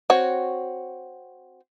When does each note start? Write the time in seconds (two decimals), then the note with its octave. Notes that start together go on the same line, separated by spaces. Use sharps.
0.10 C4 F#4 C#5